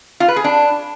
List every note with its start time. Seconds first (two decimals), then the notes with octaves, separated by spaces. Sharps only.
0.20 F4
0.28 B4
0.36 G#4
0.44 D4